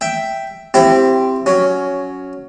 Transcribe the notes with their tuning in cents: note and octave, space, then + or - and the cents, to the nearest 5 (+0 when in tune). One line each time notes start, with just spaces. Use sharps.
E5 +5 G5 +0
C4 +0 E4 +30 G4 +0
F#3 +0 C#4 +10